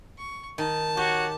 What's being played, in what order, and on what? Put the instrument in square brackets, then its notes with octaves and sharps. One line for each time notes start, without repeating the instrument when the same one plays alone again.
[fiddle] C#6
[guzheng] D#3 [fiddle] A5
[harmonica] F#4 C#5 [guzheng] G4